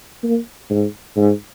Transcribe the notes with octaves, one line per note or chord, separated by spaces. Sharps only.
A#3
G#2
G#2